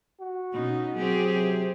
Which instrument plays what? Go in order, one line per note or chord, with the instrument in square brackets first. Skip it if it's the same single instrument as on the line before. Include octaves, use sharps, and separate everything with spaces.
[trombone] F#4
[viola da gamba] B2 C#4 D#4
[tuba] F#3 [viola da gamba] C4 G4 G#4
[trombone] C3